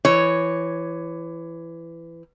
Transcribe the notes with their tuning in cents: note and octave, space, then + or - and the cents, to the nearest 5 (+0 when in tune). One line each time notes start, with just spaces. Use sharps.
E3 +20 C#5 +0